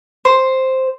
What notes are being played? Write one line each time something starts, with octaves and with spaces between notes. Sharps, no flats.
C5